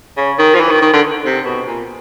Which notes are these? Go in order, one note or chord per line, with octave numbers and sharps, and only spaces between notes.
C#3
D#3
F3
E3
D#3
D#3
D3
C3
B2
A#2